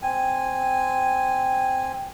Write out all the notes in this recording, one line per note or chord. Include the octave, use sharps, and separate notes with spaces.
C4 G#5